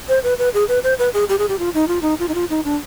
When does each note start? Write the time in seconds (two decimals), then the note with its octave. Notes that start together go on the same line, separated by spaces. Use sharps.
0.08 C5
0.23 B4
0.38 B4
0.54 G#4
0.68 B4
0.83 C5
0.99 B4
1.14 G#4
1.29 G4
1.38 G#4
1.49 G4
1.59 F4
1.74 D#4
1.88 F4
2.02 D#4
2.19 F4
2.28 D#4
2.34 F4
2.50 D#4
2.65 D4